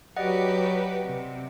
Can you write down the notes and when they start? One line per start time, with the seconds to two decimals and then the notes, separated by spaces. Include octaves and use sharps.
0.17 F#3 F#4 G4 B4 D5 D#5 F#5
1.05 C3